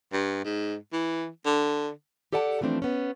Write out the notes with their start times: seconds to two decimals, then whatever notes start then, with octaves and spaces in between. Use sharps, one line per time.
0.13 G2
0.44 G#2
0.93 E3
1.46 D3
2.33 G4 A4 D5 F#5 G#5 A5
2.61 E3 F3 A3 C4 D4
2.82 B3 C#4